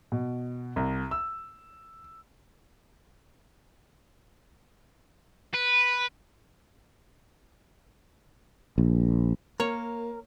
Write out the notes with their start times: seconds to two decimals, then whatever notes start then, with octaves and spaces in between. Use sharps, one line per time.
0.12 B2
0.76 C2
1.11 E6
5.54 B4
8.78 A#1
9.60 A#3 A#4 C#5